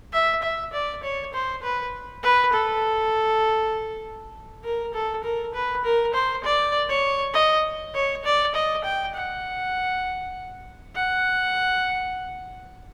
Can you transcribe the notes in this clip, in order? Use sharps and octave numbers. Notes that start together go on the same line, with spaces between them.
E5
E5
D5
C#5
C5
B4
B4
A4
A#4
A4
A#4
B4
A#4
C5
D5
C#5
D#5
C#5
D5
D#5
G5
F#5
F#5